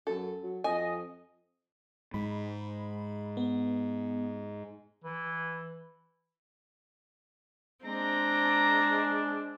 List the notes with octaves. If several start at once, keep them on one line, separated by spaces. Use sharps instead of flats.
F#2 A4
F#3
F2 D#5 G#5
G#2 B5
B3
E3
G#3 C4 D4 A#5